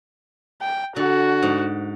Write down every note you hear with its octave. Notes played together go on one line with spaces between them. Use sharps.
G5
D3 F#4
G#2